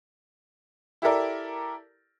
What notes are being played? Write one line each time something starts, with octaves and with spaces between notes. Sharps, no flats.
E4 G4 A4 A#4 D5